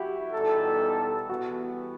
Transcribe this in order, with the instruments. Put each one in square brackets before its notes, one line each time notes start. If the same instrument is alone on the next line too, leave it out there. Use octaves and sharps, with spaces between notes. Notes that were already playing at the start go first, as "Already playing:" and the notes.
Already playing: [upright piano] E4 F#4 G4
[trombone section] E2 B2 G3 D#4 A4
[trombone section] E3 G3 B3 [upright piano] F#4